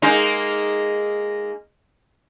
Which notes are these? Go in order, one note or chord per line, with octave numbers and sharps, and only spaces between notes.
G#3 A#3 D#4